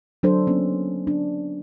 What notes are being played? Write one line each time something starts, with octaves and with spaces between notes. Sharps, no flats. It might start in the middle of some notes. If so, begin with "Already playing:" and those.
F#3 D4 A4 C5
A#3 B3 C#4
D4